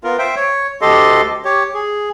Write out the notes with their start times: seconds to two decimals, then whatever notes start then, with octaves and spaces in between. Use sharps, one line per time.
0.04 B3 F4 A#4
0.19 C5 E5 G5
0.36 C#5
0.81 D2 G4 A4 D#5 C6
1.45 G4 C#5
1.74 G#4